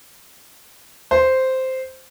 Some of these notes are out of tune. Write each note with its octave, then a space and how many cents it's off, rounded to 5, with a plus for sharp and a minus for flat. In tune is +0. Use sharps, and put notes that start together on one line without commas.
C5 -5